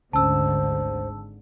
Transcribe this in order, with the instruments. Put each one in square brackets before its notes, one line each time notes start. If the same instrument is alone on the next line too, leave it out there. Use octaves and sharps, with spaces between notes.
[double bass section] G#1 G#2 D3 [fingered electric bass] D2 C#4 [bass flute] C5 [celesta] A5 E6